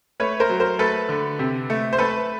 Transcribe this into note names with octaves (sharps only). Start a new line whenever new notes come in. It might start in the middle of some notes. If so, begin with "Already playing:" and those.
A3 B4 C#5
A#4 C5
F#3
A#4 C5
A3 A4 B4
D3
C3
A3
C5
A3 A4 B4